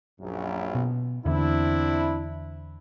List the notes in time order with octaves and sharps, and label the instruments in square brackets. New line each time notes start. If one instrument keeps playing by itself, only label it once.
[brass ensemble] A#1 F#2
[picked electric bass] B2
[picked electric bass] E2 D3 [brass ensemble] C4 D4 E4